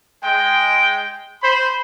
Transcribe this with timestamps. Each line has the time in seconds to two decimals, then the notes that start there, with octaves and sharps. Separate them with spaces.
0.22 G#3 G5
1.43 C5 B5